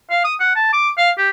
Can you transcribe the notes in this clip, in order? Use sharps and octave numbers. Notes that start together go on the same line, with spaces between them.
F5
D#6
F#5
A5
D6
F5
G4